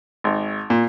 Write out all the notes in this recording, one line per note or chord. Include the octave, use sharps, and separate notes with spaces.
G#1
A#2